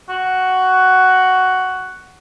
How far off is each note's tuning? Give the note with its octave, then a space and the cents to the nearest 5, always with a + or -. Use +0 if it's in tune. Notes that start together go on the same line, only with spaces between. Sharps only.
F#4 +10